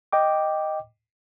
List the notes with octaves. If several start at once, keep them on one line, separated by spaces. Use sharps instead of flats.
D#5 G5 D6